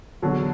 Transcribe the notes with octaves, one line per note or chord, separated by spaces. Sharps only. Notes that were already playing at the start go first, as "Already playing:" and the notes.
E2 D3 F#3